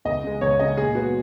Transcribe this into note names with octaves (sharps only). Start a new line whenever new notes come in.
C#2 D#5
C#3 G#3
C#2 C#5
C#3 G#3 D#5
A#2 G#4
G#3 B3 F#4